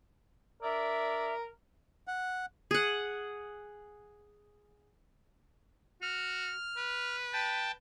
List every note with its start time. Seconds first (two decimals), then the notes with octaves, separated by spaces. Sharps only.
0.63 D4 A#4 D5 E5
2.08 F#5
2.71 G#4 F#5
6.02 F#4 F6
6.77 B4
7.33 G5 A5